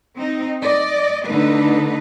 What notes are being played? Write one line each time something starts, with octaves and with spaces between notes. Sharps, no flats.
C4 D#4
D5 D#5
D3 A3 D#4 B4